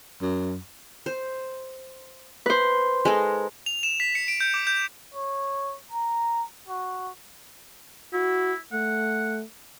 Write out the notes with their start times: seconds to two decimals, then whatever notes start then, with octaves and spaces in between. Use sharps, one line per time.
0.22 F#2
1.06 C5
2.46 B4 C5
3.05 G#3 D#4 A4
3.66 F7
3.83 E7
4.00 B6
4.15 C#7
4.28 D7
4.41 G6
4.54 D6
4.67 G6
5.14 C#5
5.92 A#5
6.69 F#4
8.13 E4 F#4
8.73 A3 F#5